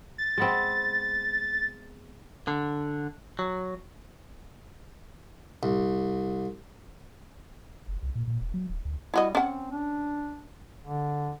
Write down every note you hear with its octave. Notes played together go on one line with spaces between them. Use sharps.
A6
G#3 B3 C4
D3
F#3
C2
F#1
C2
A#2
A#2
D#1
F#3
D1
D2
G3 E4 F#4 D#5
C4 C#4 F#5
D4
D3